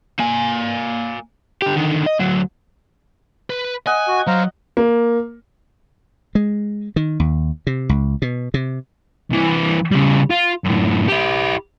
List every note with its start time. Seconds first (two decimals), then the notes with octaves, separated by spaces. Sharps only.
0.20 A#3 G#5
1.62 D3 G4
1.76 D3 D#3
2.06 D#5
2.19 D2 F#3
3.50 B4
3.87 D#5 F#5 G#5
4.08 F#4
4.27 F#3 C5 F5 A#5
4.77 A#3
6.35 G#3
6.96 D#3
7.20 D#2
7.67 C3
7.89 C#2
8.22 B2
8.54 C3
9.31 C2 E3
9.91 C#3 G3
10.30 F4
10.64 F#2 A2
11.08 E4 G4